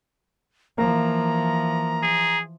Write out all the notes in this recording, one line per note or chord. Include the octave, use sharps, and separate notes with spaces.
E3 F3 A#3 A#5
G#4